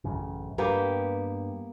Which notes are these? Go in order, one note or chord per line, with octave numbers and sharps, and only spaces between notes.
A1 F#2 C#3
G2 A#3 B3 G4